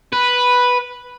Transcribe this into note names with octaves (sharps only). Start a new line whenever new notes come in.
B4